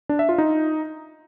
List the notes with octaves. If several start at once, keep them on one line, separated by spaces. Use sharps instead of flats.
D4
E5
F4
D#4